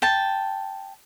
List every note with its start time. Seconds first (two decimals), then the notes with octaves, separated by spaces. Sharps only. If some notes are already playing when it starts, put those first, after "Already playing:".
0.02 G5 A5